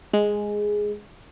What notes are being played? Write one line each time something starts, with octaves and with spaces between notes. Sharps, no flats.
G#3